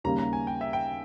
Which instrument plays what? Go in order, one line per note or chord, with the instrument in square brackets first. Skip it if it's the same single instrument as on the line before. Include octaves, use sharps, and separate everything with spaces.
[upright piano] D#2 C#3 G3 A#3 [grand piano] A#5
[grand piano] A#5
G#5
G5
E5
G5